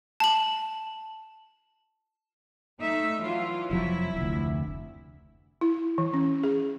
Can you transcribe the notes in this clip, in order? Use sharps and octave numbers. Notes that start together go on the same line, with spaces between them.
A5 F#7
A3 D#4 E5
E3 F#3 F4
F1 F3 F#3 E4
F1 D2
E4
E3
C#4
G#4